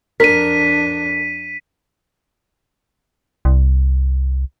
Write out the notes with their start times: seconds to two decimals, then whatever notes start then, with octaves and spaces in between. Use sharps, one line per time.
0.20 F2 D4 A#4 B6 D#7
3.45 C2